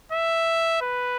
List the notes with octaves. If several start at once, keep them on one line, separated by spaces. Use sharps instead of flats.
E5
B4